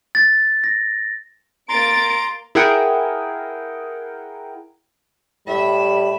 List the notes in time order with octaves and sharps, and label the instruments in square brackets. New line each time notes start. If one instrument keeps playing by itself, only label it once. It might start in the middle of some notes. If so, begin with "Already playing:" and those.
[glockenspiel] A6
A#6
[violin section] A#3 A6 D7 [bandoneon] A#5 C6
[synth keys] E4 G#4 A#4 F#5 G5
[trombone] A2 [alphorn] G3 [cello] E5 [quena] B5